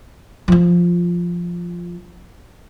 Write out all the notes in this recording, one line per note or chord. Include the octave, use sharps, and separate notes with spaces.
F3 F4